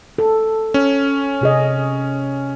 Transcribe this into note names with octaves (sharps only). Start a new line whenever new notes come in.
A4
C#4
C3 G#4 D#5